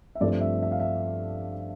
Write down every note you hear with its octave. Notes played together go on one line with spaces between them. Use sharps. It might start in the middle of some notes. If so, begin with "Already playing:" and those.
E5
G2 F3 A3 C4 D5
E5
E5
F5
E5